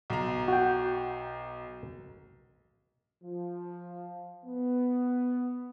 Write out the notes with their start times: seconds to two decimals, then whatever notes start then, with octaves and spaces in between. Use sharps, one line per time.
0.10 B1 A#5
0.48 F#4 G5
3.24 F3
4.45 B3